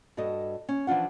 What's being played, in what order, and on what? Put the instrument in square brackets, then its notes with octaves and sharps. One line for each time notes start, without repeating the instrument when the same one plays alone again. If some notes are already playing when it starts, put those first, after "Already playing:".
[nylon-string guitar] G2 F#4 A4 D#5
C#4
E3 F3 D4 F4 F#5